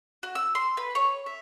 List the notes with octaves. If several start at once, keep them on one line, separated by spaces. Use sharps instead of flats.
F#4
E6
C6
B4
C#5
E5